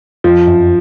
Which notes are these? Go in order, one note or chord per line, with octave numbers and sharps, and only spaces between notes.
F2 F3
F#2